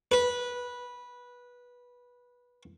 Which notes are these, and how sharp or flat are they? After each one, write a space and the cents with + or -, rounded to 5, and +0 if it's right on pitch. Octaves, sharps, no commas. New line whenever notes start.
B4 -15